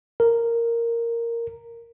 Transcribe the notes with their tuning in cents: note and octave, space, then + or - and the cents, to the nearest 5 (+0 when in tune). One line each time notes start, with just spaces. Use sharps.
A#4 -5